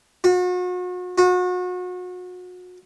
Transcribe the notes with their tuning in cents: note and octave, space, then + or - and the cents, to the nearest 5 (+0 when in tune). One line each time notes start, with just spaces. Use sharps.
F#4 -40
F#4 -35